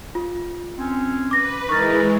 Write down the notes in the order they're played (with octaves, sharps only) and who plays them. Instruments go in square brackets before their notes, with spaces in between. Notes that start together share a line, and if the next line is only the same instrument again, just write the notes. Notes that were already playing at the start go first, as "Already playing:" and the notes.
[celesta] F4
[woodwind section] C4 C#4
[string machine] B4 [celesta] D6 A#6
[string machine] E3 G#3 [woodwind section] D#4 A#4 [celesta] C#6 A6